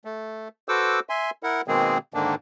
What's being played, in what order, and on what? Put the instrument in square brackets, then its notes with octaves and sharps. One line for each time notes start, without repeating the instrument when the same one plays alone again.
[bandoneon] A3
F#4 A4 B4 C5 D6 E6
E5 G#5 C6
E4 A#4 F#5
B2 D#3 G#3 A#3 C4 G#4
G#2 D3 D#3 A#3 D4